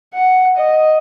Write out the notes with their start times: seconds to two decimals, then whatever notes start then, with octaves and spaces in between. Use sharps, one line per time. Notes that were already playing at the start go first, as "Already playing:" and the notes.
0.14 F#5
0.57 D#5